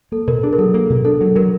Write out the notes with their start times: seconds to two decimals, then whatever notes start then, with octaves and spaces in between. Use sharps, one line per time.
0.12 A#3 A4
0.27 B2 A#4
0.43 D4 G#4
0.53 A#4
0.58 F#3 A4
0.74 A#3 A#4
0.90 B2
1.05 D4 A4
1.21 F#3
1.36 F#3 A#4